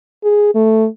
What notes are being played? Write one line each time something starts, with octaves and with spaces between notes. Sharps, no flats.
G#4
A3